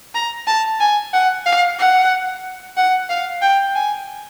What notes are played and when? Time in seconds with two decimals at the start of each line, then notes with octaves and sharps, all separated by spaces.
0.14 A#5
0.47 A5
0.80 G#5
1.13 F#5
1.46 F5
1.79 F#5
2.77 F#5
3.09 F5
3.42 G5
3.75 G#5